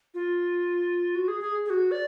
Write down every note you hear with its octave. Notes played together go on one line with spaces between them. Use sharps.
F4
F#4
G#4
G#4
G#4
F#4
D5